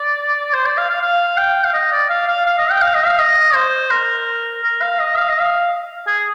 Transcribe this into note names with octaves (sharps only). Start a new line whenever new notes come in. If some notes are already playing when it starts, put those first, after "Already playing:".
Already playing: D5
C5
D5
F5
F5
F5
G5
F5
D#5
D5
F5
F5
F5
D#5
G5
F5
D#5
F5
D#5
C5
A#4
A#4
F5
D#5
F5
D#5
F5
G#4